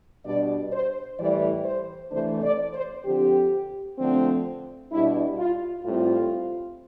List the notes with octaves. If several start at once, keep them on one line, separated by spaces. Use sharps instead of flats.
B2 G3 D4 D5
C5
A2 E3 G3 D5
C5
C3 E3 A3 D4 C5
D5
C5
D3 F3 C4 G4
D3 F3 A3 C4
B2 G3 D4 E4
F4
A2 G3 C4 F4